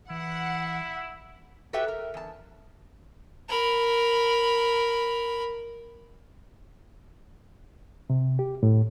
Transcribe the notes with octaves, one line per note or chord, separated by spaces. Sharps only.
E3 E4 F#5
F#4 G4 A4 B4 E5 G5
A#4
E2 A5
A#4 B5
C3
G4
A2